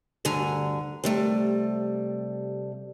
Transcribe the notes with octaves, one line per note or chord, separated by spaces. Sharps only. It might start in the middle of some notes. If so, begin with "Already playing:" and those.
D2 G2 D3 G#5 A#5
C3 G3 A3